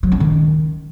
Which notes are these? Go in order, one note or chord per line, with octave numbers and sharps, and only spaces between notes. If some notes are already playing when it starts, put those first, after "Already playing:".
F#3
C#4
D#3